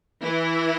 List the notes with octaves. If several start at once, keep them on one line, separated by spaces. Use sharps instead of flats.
E3 E4